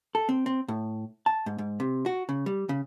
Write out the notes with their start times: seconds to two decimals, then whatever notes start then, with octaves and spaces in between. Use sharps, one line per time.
0.15 A4
0.29 C4
0.46 C4
0.68 A2
1.26 A5
1.46 G#2
1.58 G#2
1.80 C3
2.06 F#4
2.29 C#3
2.46 G3
2.69 C#3